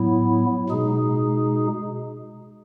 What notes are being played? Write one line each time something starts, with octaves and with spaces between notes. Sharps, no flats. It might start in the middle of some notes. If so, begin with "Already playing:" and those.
Already playing: A2 F#3 B3 E4
B2 G#3 D#4 G#4